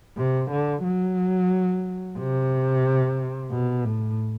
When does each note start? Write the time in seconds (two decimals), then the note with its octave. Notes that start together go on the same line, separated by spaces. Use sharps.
0.17 C3
0.51 D3
0.83 F#3
2.17 C3
3.51 B2
3.84 A2